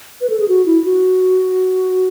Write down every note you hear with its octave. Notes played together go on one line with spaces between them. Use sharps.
B4
A4
G#4
F#4
E4
F#4